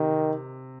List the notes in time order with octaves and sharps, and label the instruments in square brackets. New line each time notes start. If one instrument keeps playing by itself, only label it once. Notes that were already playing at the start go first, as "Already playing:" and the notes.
Already playing: [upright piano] C3 [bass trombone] D#3